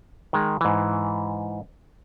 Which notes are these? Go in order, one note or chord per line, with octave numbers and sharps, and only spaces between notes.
D#3 G#3
G#2 E3